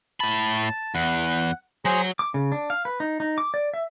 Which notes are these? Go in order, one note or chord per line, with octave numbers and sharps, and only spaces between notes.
A2 A5 B5
E2 F#5
F#3 G#4 C5 A#5
D6
C#3
D4
F5
B4
D#4
D#4
D6
D5
E5